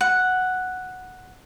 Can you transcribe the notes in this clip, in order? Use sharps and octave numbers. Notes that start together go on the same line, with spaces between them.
F#5